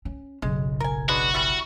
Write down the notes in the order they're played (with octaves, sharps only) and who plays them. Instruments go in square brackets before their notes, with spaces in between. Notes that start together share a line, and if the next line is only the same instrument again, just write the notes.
[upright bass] C#4
[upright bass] F#1 B1 [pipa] G#3
[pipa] A#4 G#5
[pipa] G#3 D4 B4 [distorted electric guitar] F#4
[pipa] E3 G3 B3